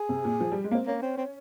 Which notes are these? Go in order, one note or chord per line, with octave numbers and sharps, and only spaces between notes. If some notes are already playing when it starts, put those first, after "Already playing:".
Already playing: G#4
C3
A#2
F3
G3
G#3
A#3
C4
A#3 C#4
C4
C4